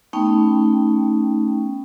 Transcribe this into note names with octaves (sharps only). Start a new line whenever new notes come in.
A3 B3 C#4 D#4 G5